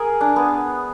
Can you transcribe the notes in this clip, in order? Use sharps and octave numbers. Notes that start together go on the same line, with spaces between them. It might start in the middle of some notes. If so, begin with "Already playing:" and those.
Already playing: G#4 A#4 G#5
D4
B3